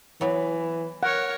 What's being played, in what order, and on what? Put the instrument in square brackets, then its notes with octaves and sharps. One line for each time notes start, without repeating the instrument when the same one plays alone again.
[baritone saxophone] E3 [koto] F#3 B3
[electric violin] A#4 C#5 [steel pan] F#5